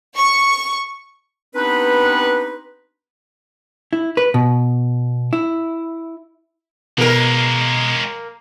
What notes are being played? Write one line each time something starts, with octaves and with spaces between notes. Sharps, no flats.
C#6
B3 C4 D4 D#4 G4 B4
E4
B4
B2
E4
B2 F#3 G#3 A#3 A#4